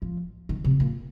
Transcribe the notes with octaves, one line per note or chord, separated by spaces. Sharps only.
F3
D#3
C3
A#2